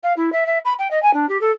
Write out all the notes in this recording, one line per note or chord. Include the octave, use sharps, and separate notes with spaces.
F5
E4
E5
E5
B5
G5
D#5
G#5
D4
G4
A4